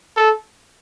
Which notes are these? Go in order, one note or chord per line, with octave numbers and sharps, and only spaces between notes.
A4